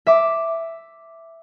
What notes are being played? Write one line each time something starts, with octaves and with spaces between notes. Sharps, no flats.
E5 D6